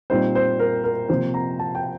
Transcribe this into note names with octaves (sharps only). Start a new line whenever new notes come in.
A#2 G3 C4 D#4 C5
C5
A#4
A#4
C3 F3 A#3 C5
A#5
A5
G5